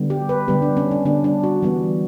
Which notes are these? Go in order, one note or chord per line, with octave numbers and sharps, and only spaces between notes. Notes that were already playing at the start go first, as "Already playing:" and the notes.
Already playing: D3 G3 B3
G4
B4
D3 G3 B3 G4
D4
C#4
D4
D3 G3 B3 D4
D4
F#4
E3 G3 B3